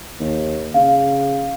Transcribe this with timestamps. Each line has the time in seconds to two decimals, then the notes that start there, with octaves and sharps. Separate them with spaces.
0.20 D#2
0.74 C#3 F5